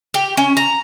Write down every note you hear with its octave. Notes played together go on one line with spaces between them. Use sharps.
G4
C#4
A#5